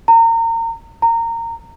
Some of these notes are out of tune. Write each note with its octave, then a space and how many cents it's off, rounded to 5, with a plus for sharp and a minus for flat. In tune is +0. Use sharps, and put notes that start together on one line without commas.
A#5 -30
A#5 -20